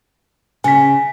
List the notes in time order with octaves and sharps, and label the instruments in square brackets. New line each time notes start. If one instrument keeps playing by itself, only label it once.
[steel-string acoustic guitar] C#3 [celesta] G#5 B6